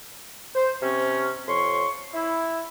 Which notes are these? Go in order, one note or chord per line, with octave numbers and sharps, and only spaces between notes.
C5
C3 C4 C#4
F2 C#5 C6 C#6
E4